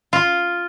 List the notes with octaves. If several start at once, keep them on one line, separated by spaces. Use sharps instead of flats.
F4